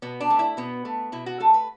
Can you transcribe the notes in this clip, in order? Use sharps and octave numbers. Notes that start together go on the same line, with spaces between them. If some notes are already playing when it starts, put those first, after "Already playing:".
B2 B3
D4
A3
E4
B2 B3
A3
B2 E4
F#4
A3 A4
B4